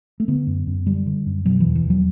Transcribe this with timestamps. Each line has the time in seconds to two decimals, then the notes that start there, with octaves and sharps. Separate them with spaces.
0.20 A3
0.28 D3 B3
0.47 F#2
0.67 F#2
0.87 D3 G3
1.07 D3
1.26 F#2
1.45 B2 F#3
1.60 E2 E3
1.75 E3
1.85 E2
1.90 F#3